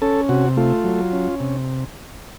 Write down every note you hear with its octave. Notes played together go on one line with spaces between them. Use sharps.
C#4 A4
C3 F#4
A3 F4
F#3
C#4
C3